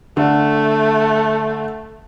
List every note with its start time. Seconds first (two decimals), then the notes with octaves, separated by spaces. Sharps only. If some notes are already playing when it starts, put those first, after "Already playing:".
0.17 D3 A3